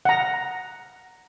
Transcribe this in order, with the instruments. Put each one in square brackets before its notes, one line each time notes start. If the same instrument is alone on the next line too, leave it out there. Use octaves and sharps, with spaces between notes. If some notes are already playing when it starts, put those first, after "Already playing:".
[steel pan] F#5 A#5